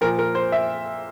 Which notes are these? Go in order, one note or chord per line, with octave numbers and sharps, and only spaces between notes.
A#2 F3 A#4
A#4
C5
E5